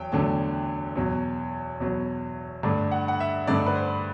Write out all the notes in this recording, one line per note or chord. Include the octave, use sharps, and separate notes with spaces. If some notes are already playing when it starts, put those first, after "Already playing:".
Already playing: E2 F#3 G5
E2 D3 F#3 A3 A5
E2 B2 F#3
E2 B2 F#3
G2 D3 A3 D4
F#5
F#5
E5
G2 D3 A3 D4 D5
B4
C5